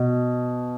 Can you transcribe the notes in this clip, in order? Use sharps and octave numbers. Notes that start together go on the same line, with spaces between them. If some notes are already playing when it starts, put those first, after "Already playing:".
Already playing: B2